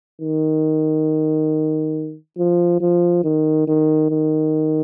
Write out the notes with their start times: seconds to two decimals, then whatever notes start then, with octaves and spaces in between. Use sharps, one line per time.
0.21 D#3
2.38 F3
2.81 F3
3.24 D#3
3.68 D#3
4.10 D#3